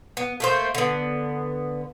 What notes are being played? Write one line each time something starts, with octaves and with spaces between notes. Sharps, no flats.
B3
A3 A#3 C5
D3 B3